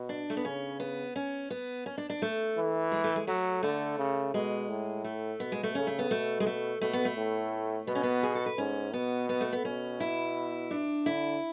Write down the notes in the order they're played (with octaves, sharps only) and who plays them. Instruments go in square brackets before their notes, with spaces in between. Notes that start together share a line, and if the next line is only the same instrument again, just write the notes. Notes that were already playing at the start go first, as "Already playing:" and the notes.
Already playing: [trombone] B2
[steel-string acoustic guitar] D4
A3
B3
[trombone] C#3 [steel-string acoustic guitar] C#4
[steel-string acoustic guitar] B3
C#4
B3
C#4
D4
D4
A3
[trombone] E3
[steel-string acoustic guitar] G#3
A3
G#3
[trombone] F#3 [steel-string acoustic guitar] A3
[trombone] D3 [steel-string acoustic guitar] A3
[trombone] C#3
[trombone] B2 [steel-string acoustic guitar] G#3
[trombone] A2
[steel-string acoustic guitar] A3
[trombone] B2 [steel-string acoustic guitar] B3
[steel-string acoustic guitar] G#3
A3
[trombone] C#3 [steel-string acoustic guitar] C#4
[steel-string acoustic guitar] A3
B3
[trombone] B2 [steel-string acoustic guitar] A3
[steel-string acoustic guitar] G#3
A3
[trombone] B2 [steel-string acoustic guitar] A3
[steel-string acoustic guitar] B3
A3
[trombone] A2
[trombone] B2 [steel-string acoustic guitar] B3
[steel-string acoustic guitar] C#4
B3
G#4
A4
B4
[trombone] G#2 [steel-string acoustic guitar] C#4
[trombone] B2 [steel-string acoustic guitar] B3
[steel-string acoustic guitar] B3
A3
B3
[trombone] B2 [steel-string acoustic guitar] C#4
[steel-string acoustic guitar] E4
D4
[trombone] D3 [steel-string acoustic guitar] E4